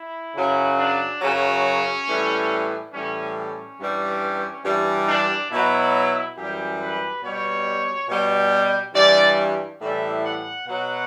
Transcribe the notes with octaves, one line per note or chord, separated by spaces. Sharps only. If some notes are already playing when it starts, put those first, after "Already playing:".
Already playing: E4
F#2 C#3 F#3
D4
F#2 C#3 F#3 C#4
A2 E3 G3
A2 E3 G3 C#4
C#4
G2 E3 G3
G2 E3 G3
D4
B2 F#3 E4
F#2 E3 G3 G4
B4
B2 G3 C#5
B2 G3
G2 E3 G3 D5
A2 E3 G3 E5
F#5
B2 F#3 F#5